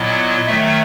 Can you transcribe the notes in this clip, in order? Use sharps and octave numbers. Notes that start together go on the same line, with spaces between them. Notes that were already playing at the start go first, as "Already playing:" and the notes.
Already playing: A#2 F#3 B3 E4 D#5
D#3 F#3 A3 E5